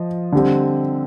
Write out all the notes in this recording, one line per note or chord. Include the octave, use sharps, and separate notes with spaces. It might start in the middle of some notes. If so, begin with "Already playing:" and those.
Already playing: F3 D#5
D3 G3 C4